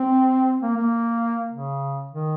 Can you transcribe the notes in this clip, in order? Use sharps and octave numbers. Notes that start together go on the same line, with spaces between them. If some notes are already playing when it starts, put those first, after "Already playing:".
Already playing: C4
A#3
A#3
C#3
D#3